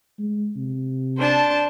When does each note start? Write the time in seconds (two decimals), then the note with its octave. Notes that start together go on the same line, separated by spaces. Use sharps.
0.19 G#3
0.56 C3
1.17 D4 C5 A5